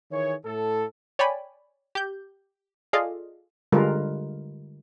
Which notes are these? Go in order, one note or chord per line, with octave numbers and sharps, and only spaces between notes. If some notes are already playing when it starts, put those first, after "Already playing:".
D#3 E3 G#4 C#5
A2 A4
C#5 D5 G5 G#5 B5
G4 G6
F4 G#4 A4 D5 D#5 F5
D3 G3 G#3 F4 A#4 B4